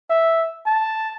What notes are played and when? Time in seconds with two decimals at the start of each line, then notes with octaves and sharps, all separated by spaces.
0.11 E5
0.66 A5